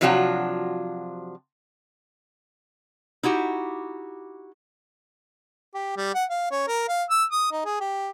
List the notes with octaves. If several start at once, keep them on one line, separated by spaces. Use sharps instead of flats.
C3 F3 F#3 D4 F4 F#4
D#4 E4 F#4 G4
G4
G3
F#5
F5
C#4
A#4
F5
E6
D#6
D#4
G#4
G4